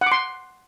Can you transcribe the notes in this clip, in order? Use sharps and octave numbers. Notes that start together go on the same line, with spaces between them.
F#5
D6
C6